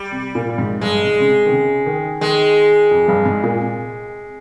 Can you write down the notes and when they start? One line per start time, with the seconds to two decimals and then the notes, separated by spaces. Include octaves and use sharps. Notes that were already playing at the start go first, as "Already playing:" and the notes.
Already playing: G3
0.11 C3
0.35 A#2
0.58 G#2
0.81 G2 G#3
1.05 G#2
1.20 C#3
1.28 C3
1.46 D#3
1.51 C#3
1.86 D#3
2.21 D#3 G#3
2.91 F2
3.08 G2
3.26 G#2
3.43 A#2
3.60 C3